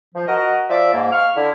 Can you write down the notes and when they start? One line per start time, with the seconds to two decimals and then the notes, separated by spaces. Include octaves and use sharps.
0.15 F3
0.28 F#4 A#4 D#5
0.70 F3 D5 E5
0.93 G#2 A#3
1.13 F5 C#6 F6
1.35 D3 E4